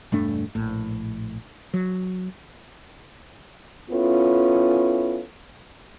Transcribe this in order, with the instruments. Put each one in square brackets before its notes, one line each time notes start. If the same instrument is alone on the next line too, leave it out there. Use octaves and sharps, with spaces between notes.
[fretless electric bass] E1 G2 A3 D4
A#1 A2
F#3
[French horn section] B3 C#4 E4 F4 A4